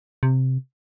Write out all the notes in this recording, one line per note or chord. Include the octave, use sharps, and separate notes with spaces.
C3